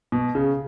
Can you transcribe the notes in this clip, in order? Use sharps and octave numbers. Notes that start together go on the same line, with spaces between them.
B2
C#3